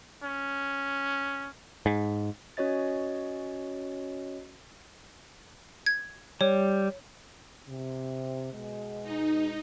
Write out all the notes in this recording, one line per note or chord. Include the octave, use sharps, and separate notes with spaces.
C#4
G#2
C#4 F#4 C#5 D#5 A6
G#6
G3 C#5
C3
B2 G#3
D#4